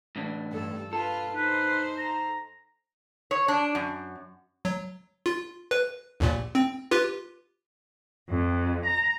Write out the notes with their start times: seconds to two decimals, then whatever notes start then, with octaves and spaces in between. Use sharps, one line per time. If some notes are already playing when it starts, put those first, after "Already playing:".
0.16 A2 E3 D4
0.53 G2 A4
0.93 F4 A4 B4
1.36 D#4 B4 C5
1.98 A#5
3.31 C#5
3.48 D4
3.75 F#2
4.65 F#3
5.26 F4
5.71 B4
6.20 A#1 D#2 A#2
6.55 C4
6.91 F4 G4 B4
8.28 F2
8.85 A#5